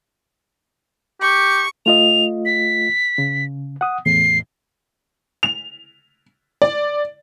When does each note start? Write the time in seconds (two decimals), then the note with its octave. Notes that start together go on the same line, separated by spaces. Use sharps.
1.22 G4 C#6
1.86 A3 F4 D#5 F7
2.45 B6
3.18 C#3
3.81 F#5 D#6
4.06 E2 A2 C7
5.43 F7
6.62 D5